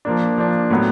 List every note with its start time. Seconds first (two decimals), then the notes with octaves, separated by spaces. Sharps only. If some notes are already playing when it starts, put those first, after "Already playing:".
0.05 F3 A#3 D4
0.38 F3 A#3 D4
0.70 A2 F#3 B3